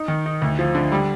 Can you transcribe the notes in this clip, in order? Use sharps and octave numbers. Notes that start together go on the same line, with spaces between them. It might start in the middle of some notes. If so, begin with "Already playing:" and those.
Already playing: D#4
D#3
D#4
D2
F3
D3
G3